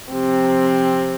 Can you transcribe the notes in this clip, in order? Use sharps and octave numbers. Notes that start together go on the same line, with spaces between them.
C3 F3 C4